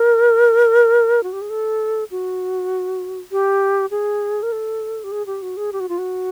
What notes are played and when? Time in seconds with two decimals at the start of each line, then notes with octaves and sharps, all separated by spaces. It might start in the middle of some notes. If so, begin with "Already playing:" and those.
Already playing: A#4
1.23 F#4
1.33 G4
1.41 G#4
1.50 A4
2.11 F#4
3.32 G4
3.91 G#4
4.43 A#4
4.52 A4
5.04 G4
5.12 G#4
5.26 G4
5.42 F#4
5.57 G#4
5.73 G4
5.80 F#4
5.89 F4
5.98 F#4